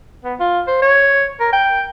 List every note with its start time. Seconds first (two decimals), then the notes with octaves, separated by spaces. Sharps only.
0.25 B3
0.40 F4
0.67 C5
0.82 C#5
1.40 A#4
1.53 G5